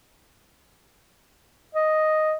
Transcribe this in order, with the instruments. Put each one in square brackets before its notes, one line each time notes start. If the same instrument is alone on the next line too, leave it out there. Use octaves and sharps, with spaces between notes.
[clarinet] D#5